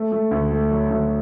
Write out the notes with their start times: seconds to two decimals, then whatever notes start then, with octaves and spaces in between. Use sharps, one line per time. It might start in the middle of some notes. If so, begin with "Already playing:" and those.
Already playing: A3
0.12 A3
0.31 D2
0.51 A3
0.71 F#3
0.90 D2